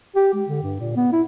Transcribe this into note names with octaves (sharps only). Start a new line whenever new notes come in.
G4
G#3
D3
G2
A#2
B3
E4